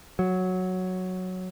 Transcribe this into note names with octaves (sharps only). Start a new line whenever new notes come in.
F#3